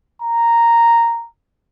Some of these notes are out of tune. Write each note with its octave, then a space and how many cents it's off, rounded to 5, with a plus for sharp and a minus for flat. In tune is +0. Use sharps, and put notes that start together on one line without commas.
A#5 -5